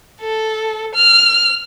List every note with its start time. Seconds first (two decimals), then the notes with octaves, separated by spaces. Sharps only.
0.21 A4
0.95 F6